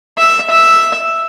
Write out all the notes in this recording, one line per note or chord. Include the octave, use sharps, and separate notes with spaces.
E5
E5